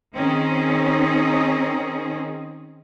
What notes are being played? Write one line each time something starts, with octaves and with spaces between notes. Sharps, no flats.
D#3 C4 C#4 D#4 G#4